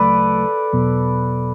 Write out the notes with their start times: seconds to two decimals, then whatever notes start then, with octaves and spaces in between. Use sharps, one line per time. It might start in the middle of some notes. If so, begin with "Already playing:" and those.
Already playing: D2 C#3 F#3 A3 A4 B4 D5
0.73 E2 B2 F#3 B3